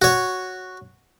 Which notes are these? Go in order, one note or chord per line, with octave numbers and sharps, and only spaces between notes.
F#4 C#5